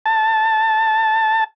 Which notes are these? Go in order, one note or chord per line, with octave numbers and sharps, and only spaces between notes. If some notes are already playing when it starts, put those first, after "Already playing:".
A5